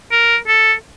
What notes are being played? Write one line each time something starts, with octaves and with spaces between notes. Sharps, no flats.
A#4
A4